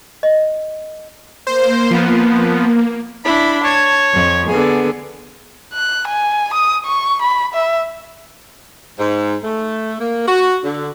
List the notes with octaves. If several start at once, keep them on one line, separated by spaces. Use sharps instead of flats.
D#5
A#3 C5
F3 B3
D4 E4 B5
C#5 A5 G#6
F2
D3 B3 G#4
F#6
G#5
D#6
C#6
B5
E5
G#2
A3
A#3
F#4
D3